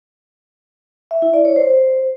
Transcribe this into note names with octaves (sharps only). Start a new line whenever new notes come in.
E5
E4
D5
C#5
C5